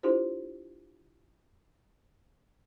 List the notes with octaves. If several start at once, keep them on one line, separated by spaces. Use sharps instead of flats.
D4 E4 F4 G4 A4 C5